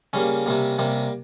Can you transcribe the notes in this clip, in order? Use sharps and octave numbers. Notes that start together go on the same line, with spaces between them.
C#3 G3 A#3 C#4
C3 G3 A#3
C3 G3 A#3